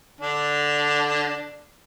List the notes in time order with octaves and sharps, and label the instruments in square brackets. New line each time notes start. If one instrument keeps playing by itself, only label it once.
[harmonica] D3 D4